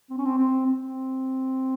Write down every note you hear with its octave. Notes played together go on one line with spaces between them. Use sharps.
C4
C#4
C4
C4
C4